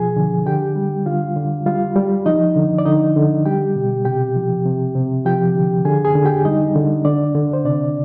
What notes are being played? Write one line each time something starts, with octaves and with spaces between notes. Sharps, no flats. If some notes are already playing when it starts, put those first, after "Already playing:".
Already playing: B2 F3 G#4 G#5
D3
D3 G4 G5
G3
D3 F4 F5
D3
G3 F4 F5
G3
F3 D#4 D#5
D3
D5
D3 D#4 D#5
D3
G3 G4 G5
B2
C3 G4 G5
F3
C3
C3
F3 G4 G5
D3
D3 G#4 G#5
G#4 G#5
D3
G4 G5
G3 D#4 D#5
D3
D3 D4 D5
D3
C5
C3 D4 D5